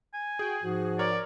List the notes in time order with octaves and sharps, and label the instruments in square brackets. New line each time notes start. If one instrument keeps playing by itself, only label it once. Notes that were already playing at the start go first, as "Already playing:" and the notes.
[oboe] G#5
[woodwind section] F#4 G5 [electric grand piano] G#4
[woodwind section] G#2 F3 [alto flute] F#4
[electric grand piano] A#4 C#5 [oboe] D5